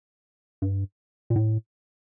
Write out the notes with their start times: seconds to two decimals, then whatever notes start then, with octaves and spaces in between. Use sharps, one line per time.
0.62 G2
1.30 A#2
1.36 A2